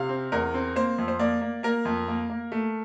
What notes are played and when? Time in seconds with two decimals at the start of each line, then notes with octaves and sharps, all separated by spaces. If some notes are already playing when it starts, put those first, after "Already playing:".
Already playing: C3 F5
0.09 C4
0.32 E2 A#4
0.54 C4
0.76 A#3 C5
0.98 F2
1.08 C5
1.19 A#3 D5
1.41 A#3
1.63 A#3 A#4
1.85 F2
2.08 A#3
2.30 A#3
2.52 A3